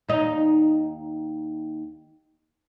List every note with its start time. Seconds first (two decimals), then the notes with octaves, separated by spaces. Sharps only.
0.08 D#2 D#4